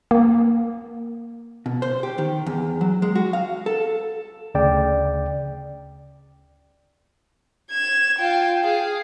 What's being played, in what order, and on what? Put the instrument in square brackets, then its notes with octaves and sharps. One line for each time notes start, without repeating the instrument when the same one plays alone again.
[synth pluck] A#3
[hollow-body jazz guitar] B2
C5
G4
D#3
E2
F#3
G#3
F#4
F5
A4
[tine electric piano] D2 C#3 D5 G5
[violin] G#6 E7
F4 G5
G#4 F5